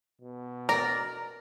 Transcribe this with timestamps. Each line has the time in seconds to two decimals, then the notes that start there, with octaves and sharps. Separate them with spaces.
0.21 B2
0.69 A#4 D5 A#5